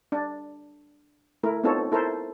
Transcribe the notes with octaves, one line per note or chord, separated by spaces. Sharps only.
D4
A3 E4 A#4
B3 C4 D#4 F4 A4 C#5
E4 A4 A#4 C5